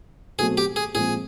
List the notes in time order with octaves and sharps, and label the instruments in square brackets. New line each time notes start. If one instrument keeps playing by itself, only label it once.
[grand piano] B2 F#3 A3 C4 [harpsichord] G#4
[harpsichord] G4
G#4
[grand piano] A#2 F3 G#3 C4 [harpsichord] G#4